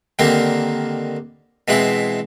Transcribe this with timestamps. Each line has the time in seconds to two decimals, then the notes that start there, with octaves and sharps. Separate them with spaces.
0.19 D3 D#3 G3 A#3 C4
1.68 B2 E3 G#3 C4 E4